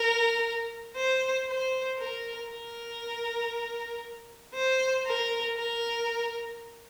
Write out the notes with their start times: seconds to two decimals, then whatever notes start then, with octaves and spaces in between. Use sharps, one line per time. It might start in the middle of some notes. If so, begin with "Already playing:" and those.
Already playing: A#4
0.96 C5
1.48 C5
1.99 A#4
2.50 A#4
4.55 C5
5.06 A#4
5.58 A#4